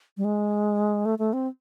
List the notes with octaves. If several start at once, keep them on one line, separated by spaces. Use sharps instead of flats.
G3
G#3
A3
A3
C4